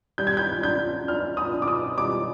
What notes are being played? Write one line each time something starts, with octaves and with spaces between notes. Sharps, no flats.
G3 G6
G#6
G6
D4 G6
D4 F6
D#6
D4
D6
D#6
G3 D6